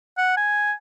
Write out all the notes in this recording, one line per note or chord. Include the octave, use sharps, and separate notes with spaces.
F#5
G#5